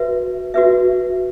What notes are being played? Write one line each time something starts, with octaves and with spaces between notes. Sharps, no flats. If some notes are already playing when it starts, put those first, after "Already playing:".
Already playing: F#4 B4 E5
F#4 B4 E5